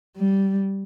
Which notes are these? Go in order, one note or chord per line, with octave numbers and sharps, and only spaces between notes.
G3